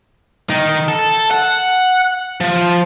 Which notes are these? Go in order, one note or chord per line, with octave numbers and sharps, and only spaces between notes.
D#3 D#4
A4
F#5
F3